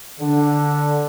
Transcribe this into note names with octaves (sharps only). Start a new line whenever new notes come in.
D3